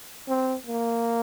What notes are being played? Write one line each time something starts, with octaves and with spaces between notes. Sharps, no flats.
C4
A#3